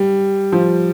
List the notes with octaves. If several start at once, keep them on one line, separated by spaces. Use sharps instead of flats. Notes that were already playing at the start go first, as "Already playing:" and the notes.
Already playing: G3
F3